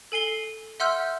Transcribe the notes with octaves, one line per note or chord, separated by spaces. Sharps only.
A4 G#5 C7 G7
E5 F#5 C6 E6 F6 G6